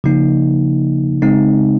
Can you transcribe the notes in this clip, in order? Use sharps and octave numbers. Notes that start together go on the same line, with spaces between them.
C#3 F3 A#3 D#4
C#3 G#3 C4 D#4